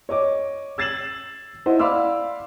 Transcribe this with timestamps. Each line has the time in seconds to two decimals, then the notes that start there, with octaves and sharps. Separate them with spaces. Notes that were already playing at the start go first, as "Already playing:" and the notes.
0.09 C#5 D#5 D6
0.78 E6 G#6 A6 C7 E7 F#7
1.66 E4 C5 D#5 F#5
1.79 D5 F5 B5 C6 D6 E6